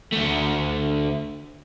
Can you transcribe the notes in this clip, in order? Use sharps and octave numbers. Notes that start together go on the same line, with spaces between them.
D2 A3